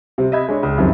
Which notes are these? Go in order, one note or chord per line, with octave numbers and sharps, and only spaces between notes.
C3 G3 C4
D#5 E5 B5 G#6
G#3 D4 C#5
C#2
F#2 C3 D#3 F3